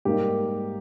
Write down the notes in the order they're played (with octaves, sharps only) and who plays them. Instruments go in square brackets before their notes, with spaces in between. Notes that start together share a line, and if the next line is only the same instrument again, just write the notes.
[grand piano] G#2 G3 A#3 D#4 G4 A#4